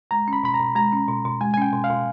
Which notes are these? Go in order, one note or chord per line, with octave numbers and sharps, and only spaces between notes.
G#3 A#5
C#4
B5
B2 B5
A#5
B2
G#3 A#5
C#4
B2
B2
G#3 G#5
G#5
C#4 G5
B2
F5
B2